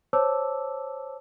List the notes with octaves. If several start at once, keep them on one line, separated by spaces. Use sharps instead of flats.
C5 C#5 A5 D6 E6